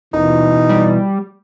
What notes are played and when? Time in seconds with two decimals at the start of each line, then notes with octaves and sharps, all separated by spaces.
0.14 D#1 B2 E3 D#4
0.69 G3